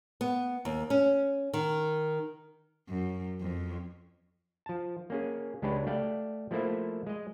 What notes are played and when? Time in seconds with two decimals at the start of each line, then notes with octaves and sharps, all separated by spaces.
0.21 B3
0.65 D#2
0.90 C#4
1.53 D#3
2.89 F#2
3.41 F2
4.66 F3 A5
5.10 A#3 C#4 G#4
5.62 C#2 G#3 D4 G4 B4 C#5
5.87 A3 D5 F5 G5
6.51 F3 A3 A#3 E4 C5 E5
7.06 G#3 D#5